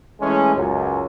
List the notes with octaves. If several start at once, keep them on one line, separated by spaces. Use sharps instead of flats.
E3 G#3 A3 C#4
C#2 F#2